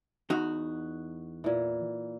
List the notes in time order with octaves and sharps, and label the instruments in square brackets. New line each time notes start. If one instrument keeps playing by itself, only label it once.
[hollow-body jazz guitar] E2 D#4 F#4
[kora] A#2 E3